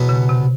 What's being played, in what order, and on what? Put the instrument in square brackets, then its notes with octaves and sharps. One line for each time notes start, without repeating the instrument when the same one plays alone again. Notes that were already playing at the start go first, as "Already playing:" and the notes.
Already playing: [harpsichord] E2 B2 F#3 B3
[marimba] C#3
C3